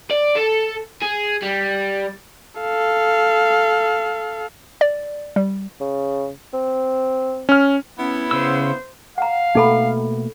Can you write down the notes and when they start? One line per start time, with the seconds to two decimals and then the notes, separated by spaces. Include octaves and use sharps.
0.11 D5
0.37 A4
1.02 G#4
1.42 G3
2.61 A4 F5
4.81 D5
5.36 G3
5.81 C#3
6.53 C4
7.49 C#4 F6
7.98 B3 C#4 E4
8.31 C#3 C5 E6
9.18 F5 F#5 A#5
9.55 B2 A3 A#3 D#4 A4 B5